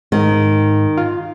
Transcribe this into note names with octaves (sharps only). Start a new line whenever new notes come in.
G#2 D#3
F4